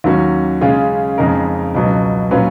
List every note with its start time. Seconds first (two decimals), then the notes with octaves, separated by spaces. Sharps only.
0.04 D#2 D#3 F#3 C#4 F#4
0.61 C#3 G#3 C#4 F4 G#4
1.18 F2 C#3 G#3 D#4 A#4
1.74 C#2 B2 F#3
2.31 A#2 F#3 C#4 F4 B4